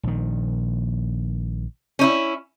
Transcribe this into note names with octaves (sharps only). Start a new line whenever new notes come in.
A#1 D#3
C#4 D#4 E4